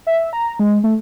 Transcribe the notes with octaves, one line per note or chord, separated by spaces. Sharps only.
E5
A#5
G#3
A3